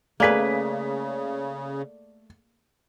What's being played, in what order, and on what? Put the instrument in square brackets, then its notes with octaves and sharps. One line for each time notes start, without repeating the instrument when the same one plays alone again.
[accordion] C#3 [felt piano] A3 D5 B6 [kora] A#3 G#4 B4